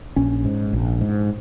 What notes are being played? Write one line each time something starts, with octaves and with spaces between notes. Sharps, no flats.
A#1 C#4
G#2
A#1
G#2